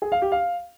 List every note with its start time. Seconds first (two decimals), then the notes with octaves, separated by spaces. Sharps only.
0.02 G#4
0.12 F5
0.22 G4
0.32 F5